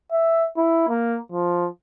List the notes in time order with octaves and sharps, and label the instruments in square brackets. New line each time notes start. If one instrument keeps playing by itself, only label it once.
[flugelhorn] E5
E4
A#3
F3